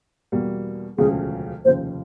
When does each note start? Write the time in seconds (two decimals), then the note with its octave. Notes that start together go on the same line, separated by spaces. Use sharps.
0.32 E2 B2 G3 A#3
0.98 E1 D2 C#3 F3 G#3 G#4
1.65 F1 D#2 C#3 F3 C5